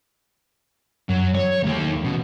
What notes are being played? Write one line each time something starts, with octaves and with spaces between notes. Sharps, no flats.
F#2 F#3
F#3 C#5
D#2 D3 F#3 A3 G4
B2 E3 B3 C#4